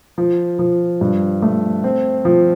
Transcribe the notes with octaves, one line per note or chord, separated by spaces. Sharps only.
F3
F3
G2
A3
C4
F3